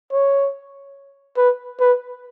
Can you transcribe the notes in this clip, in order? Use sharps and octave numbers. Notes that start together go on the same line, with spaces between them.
C#5
B4
B4